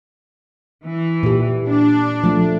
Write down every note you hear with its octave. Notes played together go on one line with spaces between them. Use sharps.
E3
A#2 G4
D4
F3 A3